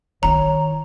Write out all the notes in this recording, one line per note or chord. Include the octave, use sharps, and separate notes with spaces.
D#3 E4 C#5 A#5